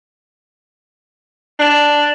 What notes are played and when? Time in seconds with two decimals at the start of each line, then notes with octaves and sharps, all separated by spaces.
1.59 D4